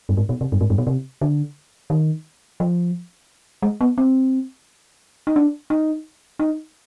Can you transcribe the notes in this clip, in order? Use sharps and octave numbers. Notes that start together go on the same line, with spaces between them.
G2
G#2
B2
C3
G2
G#2
G2
B2
C3
D3
D#3
F3
G#3
B3
C4
D#4
D4
D#4
D#4